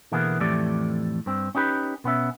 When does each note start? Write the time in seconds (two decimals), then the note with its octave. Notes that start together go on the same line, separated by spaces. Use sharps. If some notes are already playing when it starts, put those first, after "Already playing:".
0.12 B2 D3 E3 A#3 B3 G#4
0.40 F2 A2 E3 A3 G4 D5
1.26 G2 C4
1.55 C#4 D#4 G4 B4
2.04 B2 B3 C#4 E5